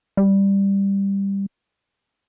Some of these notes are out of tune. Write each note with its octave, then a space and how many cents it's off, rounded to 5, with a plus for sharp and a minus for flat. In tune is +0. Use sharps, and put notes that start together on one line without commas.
G3 +10